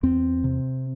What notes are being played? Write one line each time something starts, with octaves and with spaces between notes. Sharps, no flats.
E2 C4
C3